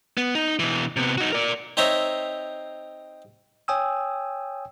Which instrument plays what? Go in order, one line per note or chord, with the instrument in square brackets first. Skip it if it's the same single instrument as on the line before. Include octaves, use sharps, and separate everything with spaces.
[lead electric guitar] B3
D#4
B2 E3
C3 B3
D#4 F#4
A#4 D5
[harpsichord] C4 D#4 C5 C#5 E5 A#5
[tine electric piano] C#5 G5 G#5 D#6 E6